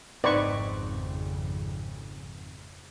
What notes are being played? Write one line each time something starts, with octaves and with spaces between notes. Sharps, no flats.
G#1 F2 C#3 C4 D#4 B4 D5 C#6